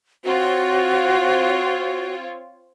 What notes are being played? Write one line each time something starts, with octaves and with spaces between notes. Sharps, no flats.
C4 F4 F#4 C#5